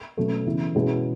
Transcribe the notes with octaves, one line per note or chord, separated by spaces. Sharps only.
B2 F#3 A3 C#4
C#3 E3 B3 E4
B2 G#3 C#4 E4